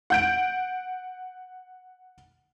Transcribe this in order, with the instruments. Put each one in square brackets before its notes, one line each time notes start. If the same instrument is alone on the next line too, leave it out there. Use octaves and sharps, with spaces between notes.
[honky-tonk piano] F#5 G6 D7